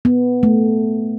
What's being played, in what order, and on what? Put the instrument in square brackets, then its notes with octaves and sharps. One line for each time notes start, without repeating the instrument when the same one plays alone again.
[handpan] B3
A3